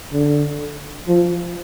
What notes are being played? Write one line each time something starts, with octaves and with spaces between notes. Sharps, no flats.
D3
F3